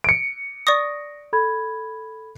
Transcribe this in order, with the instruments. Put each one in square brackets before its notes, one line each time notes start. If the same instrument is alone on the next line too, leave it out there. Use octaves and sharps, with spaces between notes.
[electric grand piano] C#7 D7
[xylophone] D5 C#6 D#6 [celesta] A#6
[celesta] A4 B5 G#6